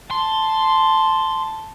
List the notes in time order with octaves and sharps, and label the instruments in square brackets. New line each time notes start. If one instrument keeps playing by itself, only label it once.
[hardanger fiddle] A5 [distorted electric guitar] C6